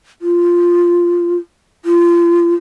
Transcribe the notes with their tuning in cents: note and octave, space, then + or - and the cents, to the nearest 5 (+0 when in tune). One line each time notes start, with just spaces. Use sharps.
F4 -5
F4 -25